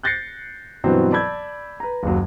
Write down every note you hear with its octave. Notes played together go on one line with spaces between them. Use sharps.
F#6 G6 A6 A#6 C7 C#7
G2 B2 E3 F#3 B3 C4
D5 A5 B5 E6 G6 G#6
B4 A#5
F#1 D#2 F#3